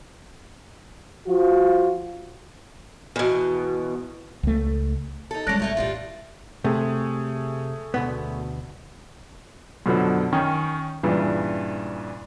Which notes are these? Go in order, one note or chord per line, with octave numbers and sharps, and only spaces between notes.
F3 F4 F#4
E2 B2
C#2 A3
D#4 A4
G3 G#3 C#4 D4 F#6 A#6 D7
A#1 D3 A3 C#4
E2 A2 G3 D4 F4
C3 A3 G#4
D2 B2 B3
F#2 B2 D3 F3
D#3 C#4 G5
G2 A#2 C#3 E3